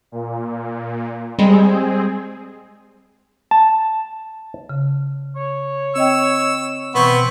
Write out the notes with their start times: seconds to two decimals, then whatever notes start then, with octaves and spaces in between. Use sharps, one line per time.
0.12 A#2
1.39 G3 G#3 C4 G#4
3.51 A5
4.69 C#3
5.36 C#5
5.96 C4 D#5 G5 E6
6.95 B2 E3 B3 C4 C#6